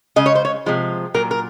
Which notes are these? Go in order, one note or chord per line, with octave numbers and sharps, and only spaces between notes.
C#3 G#3 D#5
C#5
C5
C#5
C3 F3 G#3
A#2 F#3 A#4
A#4